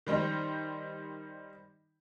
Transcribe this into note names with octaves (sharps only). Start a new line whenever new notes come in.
D#3 G3 D#4 C5